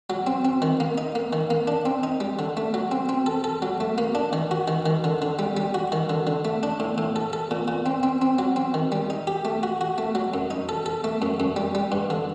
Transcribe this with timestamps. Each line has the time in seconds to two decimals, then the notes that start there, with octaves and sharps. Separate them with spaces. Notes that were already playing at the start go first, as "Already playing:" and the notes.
0.10 F#3
0.27 C4
0.45 C4
0.62 D#3
0.80 A#3
0.98 D#4
1.15 A#3
1.33 D#3
1.50 A#3
1.67 D4
1.86 C4
2.03 D#4
2.20 G3
2.39 D3
2.57 A3
2.74 F#3
2.91 C4
3.09 C4
3.26 A4
3.44 A4
3.62 F#3
3.81 A3
3.98 A#3
4.15 D4
4.33 D#3
4.51 F#4
4.68 D#3
4.86 D#3
5.04 D3
5.22 D3
5.39 G3
5.57 G3
5.74 F#4
5.92 D#3
6.10 D3
6.27 D3
6.45 A3
6.63 D4
6.80 A2
6.98 A2
7.16 A4
7.33 A4
7.51 A#2
7.68 A#2
7.86 C4
8.03 C4
8.22 C4
8.39 F#3
8.56 C4
8.74 D#3
8.92 G3
9.10 D#4
9.27 G4
9.45 A3
9.63 F#4
9.81 F#4
9.98 A3
10.15 F#3
10.34 F#2
10.51 D#4
10.69 A4
10.86 A4
11.04 A3
11.22 F#2
11.40 F#2
11.56 G3
11.75 G3
11.92 G2
12.10 D3